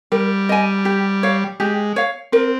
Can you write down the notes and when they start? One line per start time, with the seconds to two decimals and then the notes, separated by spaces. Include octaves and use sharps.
0.12 G3 A#4
0.49 D#5 G#5
0.85 G4
1.23 C#5 F5
1.60 G#3 G4
1.96 C#5 F5
2.32 C4 A#4